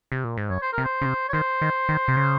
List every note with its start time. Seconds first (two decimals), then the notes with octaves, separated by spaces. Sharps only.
0.12 C3
0.24 A#2
0.37 G#2
0.50 F#2 C#5
0.62 C5
0.73 A#4
0.78 C3
0.84 C5
1.02 C#3
1.05 C3
1.29 C#5
1.33 D#3 C5
1.61 D#3
1.89 D#3
2.08 C3
2.17 C#3